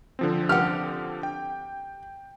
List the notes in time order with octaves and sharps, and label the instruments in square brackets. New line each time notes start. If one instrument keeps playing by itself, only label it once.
[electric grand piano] D3 F3 C4
[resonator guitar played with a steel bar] G4 F#5 [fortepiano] F6
[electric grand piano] G5